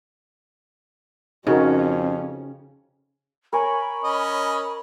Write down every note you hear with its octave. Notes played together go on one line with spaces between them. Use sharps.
F2 C#3 C#4 D#4 F#4 A#4
A#4 C#5 G#5 B5
C#4 D#5